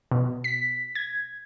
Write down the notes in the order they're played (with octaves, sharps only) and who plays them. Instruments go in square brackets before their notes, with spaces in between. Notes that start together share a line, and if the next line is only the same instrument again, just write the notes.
[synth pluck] B2
B6
G#6